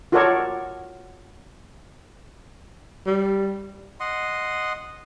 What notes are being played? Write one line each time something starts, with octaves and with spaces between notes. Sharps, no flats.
F4 F#4 A4 A#4 C#5 D5
G3
D#5 F#5 C6